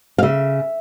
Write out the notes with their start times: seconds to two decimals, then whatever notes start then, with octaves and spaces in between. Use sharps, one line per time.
0.18 F5
0.23 C#3 E5